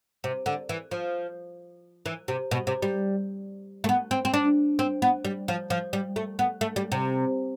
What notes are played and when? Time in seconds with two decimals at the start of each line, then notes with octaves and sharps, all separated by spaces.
0.24 C3
0.46 D3
0.69 E3
0.91 F3
2.06 E3
2.28 C3
2.51 B2
2.67 C3
2.82 G3
3.84 A3
3.89 B3
4.11 C4
4.25 C4
4.34 D4
4.79 C4
5.02 B3
5.25 G3
5.48 F3
5.70 F3
5.93 G3
6.16 A3
6.39 B3
6.61 A3
6.76 G3
6.92 C3